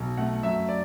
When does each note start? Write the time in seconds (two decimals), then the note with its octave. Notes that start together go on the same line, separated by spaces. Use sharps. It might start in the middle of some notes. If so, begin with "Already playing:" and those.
Already playing: B1
0.17 A3 F#5
0.43 F#2 E5
0.69 D5